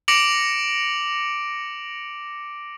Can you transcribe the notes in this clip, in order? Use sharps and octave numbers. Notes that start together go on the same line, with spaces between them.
D6 A#6 C#7 D7 F7 F#7